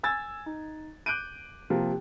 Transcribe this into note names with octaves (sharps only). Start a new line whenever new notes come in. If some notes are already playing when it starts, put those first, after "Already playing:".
G#5 E6 G#6 A6
D#4
D6 F#6 G6 D7 D#7
C3 F3 A#3